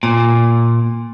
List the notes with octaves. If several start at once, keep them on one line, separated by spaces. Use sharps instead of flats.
A#2